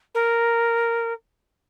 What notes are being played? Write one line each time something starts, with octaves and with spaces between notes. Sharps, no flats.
A#4